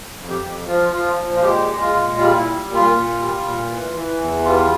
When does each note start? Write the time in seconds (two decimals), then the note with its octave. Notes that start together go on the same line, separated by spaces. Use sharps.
0.17 F2
0.30 G4
0.42 F2
0.67 F3 F4
0.92 F3 F4
1.18 A#2
1.36 F4
1.43 G#3 G4
1.68 G#3
1.81 F4
1.93 A#2
2.18 G3 F4
2.38 E4
2.44 G3
2.69 A#2
2.75 F4
2.94 A#2
3.19 G3
3.45 A#2
3.70 E3
3.94 E3
4.20 E2
4.45 G3 F4